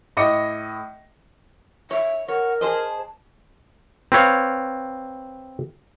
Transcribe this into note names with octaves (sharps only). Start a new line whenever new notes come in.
A2 D#5 D6 A#6 C#7
C#5 E5
A#4 C#5 F#5
G#4 C5 D#5 A5
C4 B4 C#5 F5